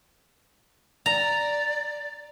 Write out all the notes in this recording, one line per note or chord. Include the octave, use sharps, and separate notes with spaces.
D5 A#5